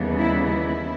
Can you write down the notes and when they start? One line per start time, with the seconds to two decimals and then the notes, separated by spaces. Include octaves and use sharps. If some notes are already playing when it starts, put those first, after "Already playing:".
Already playing: D#2 C#3 E3 G3 B3
0.18 E4
0.47 E4